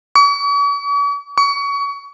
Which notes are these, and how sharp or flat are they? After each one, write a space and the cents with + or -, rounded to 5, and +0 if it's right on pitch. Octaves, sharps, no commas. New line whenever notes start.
C#6 +45
C#6 +30